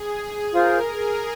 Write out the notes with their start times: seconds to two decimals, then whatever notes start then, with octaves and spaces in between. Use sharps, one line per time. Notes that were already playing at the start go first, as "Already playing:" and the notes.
Already playing: G#4
0.52 F4 G#4 A#4 C5 F5
0.88 G#4